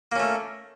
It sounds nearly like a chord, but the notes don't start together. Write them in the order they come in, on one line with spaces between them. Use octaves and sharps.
A#3 C#4 A3